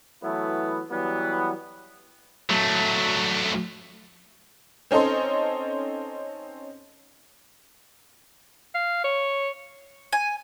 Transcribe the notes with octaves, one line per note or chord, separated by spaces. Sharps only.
E3 F#3 A3 B3 E4
E3 F#3 G3 B3
F#3 A3
C4 C#4 D#4 A4 C5
F5
C#5
G#5